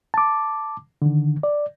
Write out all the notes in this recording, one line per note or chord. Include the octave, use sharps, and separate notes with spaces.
A5 D6
D3 D#3
D5